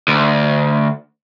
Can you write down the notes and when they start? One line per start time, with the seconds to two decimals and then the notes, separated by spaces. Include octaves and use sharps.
0.08 D2